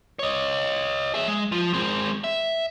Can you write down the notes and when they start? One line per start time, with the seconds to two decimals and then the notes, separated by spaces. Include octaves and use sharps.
0.19 C#5 D#5
1.14 G#4 E5
1.28 G#3
1.52 F3
1.74 G#3 C4
2.24 E5